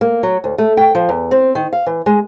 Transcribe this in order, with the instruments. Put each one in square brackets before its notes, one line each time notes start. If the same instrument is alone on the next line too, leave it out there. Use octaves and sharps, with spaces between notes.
[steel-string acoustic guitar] A#3
F#3
D2
A3
G5
F3
E2
C4
D#3
F5
E3
G#3